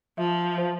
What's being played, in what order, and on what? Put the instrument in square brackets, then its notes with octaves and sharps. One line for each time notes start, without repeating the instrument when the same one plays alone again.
[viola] F3 [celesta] E5
[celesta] C5